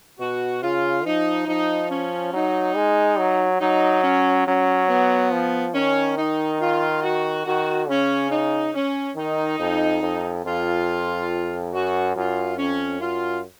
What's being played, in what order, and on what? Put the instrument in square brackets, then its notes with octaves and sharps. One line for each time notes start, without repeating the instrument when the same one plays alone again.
[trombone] B2 [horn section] F#4
[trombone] C#3 [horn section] F4
[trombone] F3 [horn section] D#4
[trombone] F3 [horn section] D#4
[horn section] C#4
[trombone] F#3 [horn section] D#4
[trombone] G#3
F#3
[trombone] F#3 [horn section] D#4
[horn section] C#4
[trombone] F#3 [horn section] C#4
[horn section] B3
[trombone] F3
[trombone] D#3 [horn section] C#4
[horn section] D#4
F4
F#4
[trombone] D#3 [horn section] F#4
[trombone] C#3 [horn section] C#4
[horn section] D#4
C#4
[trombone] D#3 [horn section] D#4
[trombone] F2
F2
[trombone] F2 [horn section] F4
[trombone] F#2 [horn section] F#4
[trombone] F#2 [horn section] F4
[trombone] F2 [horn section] C#4
[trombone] F#2 [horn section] F4